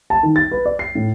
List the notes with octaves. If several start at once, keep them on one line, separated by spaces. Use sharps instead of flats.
A5
D#3
A6
B4
D5
C7
A2